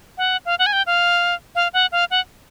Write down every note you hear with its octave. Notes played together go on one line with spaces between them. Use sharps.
F#5
F5
F#5
G#5
G5
F5
F5
F#5
F5
F#5